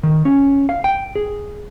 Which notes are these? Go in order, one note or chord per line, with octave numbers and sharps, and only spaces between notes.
D#3
C#4
F5
G5
G#4